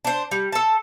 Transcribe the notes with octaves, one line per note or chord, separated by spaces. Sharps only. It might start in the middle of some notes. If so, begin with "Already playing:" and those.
D4 C5
G3
A4 A5